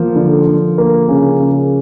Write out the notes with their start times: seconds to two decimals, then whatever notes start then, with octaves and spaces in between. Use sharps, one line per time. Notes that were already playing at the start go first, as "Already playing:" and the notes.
Already playing: F3 A#3
0.16 D3
0.47 D3
0.78 A#3
1.08 C#3
1.39 C#3